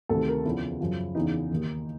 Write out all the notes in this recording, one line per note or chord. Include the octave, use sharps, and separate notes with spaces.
D2 C3 D#3 A4
A#4
E2 C#3 F3 E4
F#2 C#3 F3
E2 C#3 E3 D#4
D#2 D#3